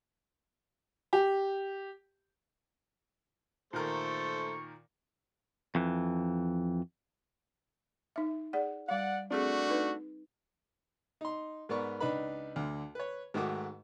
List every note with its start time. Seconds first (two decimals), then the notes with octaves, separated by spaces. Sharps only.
1.13 G4
3.73 A#2 D#3 A3 A4 A#4 C5 C#6
5.75 F2 E3
8.16 D#4 E5
8.53 G#4 D5 F#5
8.89 G3 D5 F5 F#5
9.31 A3 C4 D4 F#4 G#4
9.70 D#4 B4
11.21 D#4 C6
11.69 G#2 B3 A#4 D5 C#6
12.00 C#2 D4 D#4 B4 B5
12.56 D2 D3
12.95 B4 C#5
13.34 G#2 D#3 A3 F#4 D6